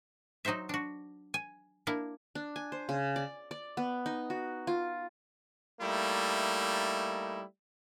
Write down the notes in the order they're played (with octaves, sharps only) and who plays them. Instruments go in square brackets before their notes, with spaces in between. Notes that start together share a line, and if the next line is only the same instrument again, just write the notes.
[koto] F#3 D#4 F#4 C5 E5
D4 F#4
G#5
A#3 D4 E4
[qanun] D4
G#5
C5
C#3
D5
D5
B3
D#4
F#4
F4
[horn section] G3 A3 A#3 D#4 E4